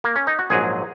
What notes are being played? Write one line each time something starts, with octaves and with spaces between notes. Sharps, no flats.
A#3
C#4
D#4
F#4
A#1 G#2 F#3 G#4